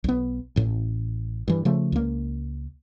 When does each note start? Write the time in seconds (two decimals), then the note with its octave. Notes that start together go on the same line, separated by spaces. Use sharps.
0.04 B1 B3
0.56 A1 A2
1.48 G2 E3
1.65 C#3 F3 A3
1.92 C#2 A#3